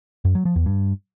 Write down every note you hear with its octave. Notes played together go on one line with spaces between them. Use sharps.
F#2
F#3
F3
E2
G2